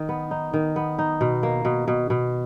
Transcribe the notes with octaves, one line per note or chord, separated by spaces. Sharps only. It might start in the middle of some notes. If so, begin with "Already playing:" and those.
Already playing: D#3
B3
D#4
D#3
B3
D#4
B2
A#3
B2
B2
B2